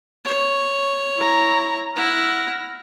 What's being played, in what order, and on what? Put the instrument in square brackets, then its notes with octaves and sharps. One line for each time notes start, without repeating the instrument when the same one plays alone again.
[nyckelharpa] C#5
[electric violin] E4 A#5
[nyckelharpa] E4 F#5 [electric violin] F6 A#6